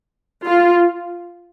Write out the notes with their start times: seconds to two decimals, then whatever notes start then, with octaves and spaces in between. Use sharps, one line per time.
0.46 F4